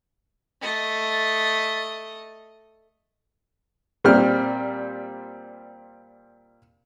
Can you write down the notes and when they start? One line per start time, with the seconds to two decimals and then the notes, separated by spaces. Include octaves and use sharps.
0.61 A3 D#5
4.04 A#2 G3 C4 F6